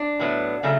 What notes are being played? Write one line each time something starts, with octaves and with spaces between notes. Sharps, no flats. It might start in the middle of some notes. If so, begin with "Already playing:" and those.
Already playing: D4
A2 F#3 B3
C#3 F#3 A3